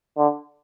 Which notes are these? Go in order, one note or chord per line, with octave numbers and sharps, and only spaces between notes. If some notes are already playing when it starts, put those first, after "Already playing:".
D3